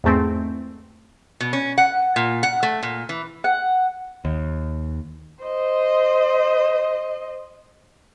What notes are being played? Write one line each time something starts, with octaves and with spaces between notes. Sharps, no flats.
E2 G#2 A3 C4
B2
C#4
F#5
A#2
F#5
A3
A#2
E3
F#5
D#2
C5 D#5